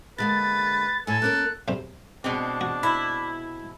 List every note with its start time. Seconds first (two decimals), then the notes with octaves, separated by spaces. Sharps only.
0.18 D3 G#3 A#3 B4 A6
1.07 A2 A4 C#5 G#5
1.22 A#3 C#4 A#4 F#6
1.68 B1 C3 C5
2.24 B2 G#3 C4 D4
2.61 F#4
2.83 E4